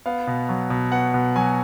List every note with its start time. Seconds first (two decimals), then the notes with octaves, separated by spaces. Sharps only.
0.06 B3 F5
0.27 B2
0.49 F#3
0.70 B2
0.92 B3 F#5
1.14 B2
1.36 F#3 G#5